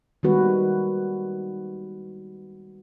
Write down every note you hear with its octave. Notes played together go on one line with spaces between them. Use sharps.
D#3 G3 G#3 B3 F#4 B4